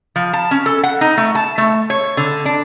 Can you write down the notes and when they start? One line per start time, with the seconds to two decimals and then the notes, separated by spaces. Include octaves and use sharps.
0.16 F3
0.33 A5
0.51 C#4
0.66 A4
0.83 F#5
1.01 D#4
1.17 A3
1.35 A5
1.58 A3
1.90 C#5
2.17 D3
2.45 D4